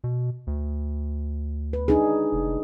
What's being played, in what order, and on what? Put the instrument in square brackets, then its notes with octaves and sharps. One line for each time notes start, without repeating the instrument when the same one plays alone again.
[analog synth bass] B2
D2
[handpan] B4
D4 D#4 G#4
[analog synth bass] F1